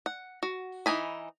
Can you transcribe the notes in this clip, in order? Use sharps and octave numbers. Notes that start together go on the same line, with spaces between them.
F#5
F#4
E3 D#4 G#5 B5